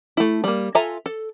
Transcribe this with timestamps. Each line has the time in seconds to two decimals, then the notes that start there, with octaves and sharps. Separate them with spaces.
0.17 A3 E4
0.44 G3 A#3
0.75 F4 A4 E5 G#5 A#5
1.06 A4